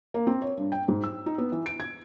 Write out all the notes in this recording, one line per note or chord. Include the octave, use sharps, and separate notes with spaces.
A#3
C4
C#5
G2
G5
G#2
E6
D#4
B3
E3
D7
G#6